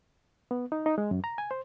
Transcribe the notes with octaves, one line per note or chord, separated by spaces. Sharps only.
B3
D#4
D#4
G#3
F#2
A#5
G#5
C5